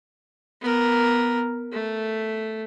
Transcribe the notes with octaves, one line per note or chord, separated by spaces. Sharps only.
B3 A#4
A3